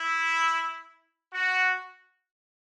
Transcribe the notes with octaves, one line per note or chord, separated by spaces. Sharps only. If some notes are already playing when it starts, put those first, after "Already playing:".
Already playing: E4
F#4